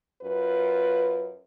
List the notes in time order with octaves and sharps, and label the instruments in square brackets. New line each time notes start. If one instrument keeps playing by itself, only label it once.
[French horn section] F#2 F4 B4